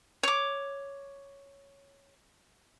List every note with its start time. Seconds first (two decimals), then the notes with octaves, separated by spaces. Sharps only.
0.23 C#5 D6